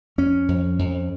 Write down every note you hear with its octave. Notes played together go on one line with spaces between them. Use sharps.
F2 C#4
F2
F2